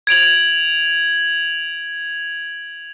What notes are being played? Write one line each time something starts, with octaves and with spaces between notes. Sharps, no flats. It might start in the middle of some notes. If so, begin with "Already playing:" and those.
G#6 D7 F7 F#7